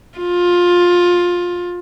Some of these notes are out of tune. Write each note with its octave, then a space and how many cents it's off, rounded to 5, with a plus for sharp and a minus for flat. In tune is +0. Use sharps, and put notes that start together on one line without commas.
F4 +15